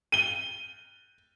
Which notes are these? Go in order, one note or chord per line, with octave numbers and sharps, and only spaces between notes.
D#7 G7